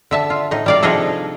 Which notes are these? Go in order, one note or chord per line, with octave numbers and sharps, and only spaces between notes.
D3 E5 A5
F4
A2 D#4
G3 D5 F5
C3 F3 D4 D#4 G#4 A4